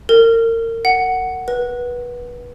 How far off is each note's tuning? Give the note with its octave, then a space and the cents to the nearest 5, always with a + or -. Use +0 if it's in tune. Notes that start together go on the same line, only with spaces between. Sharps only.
A#4 -35
F#5 +5
B4 -25